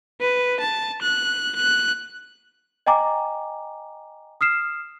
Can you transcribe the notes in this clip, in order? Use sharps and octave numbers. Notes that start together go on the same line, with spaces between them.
B4
A5
F#6
F#6
D#5 G5 G#5 A#5 D6
D#6 F6 C7 E7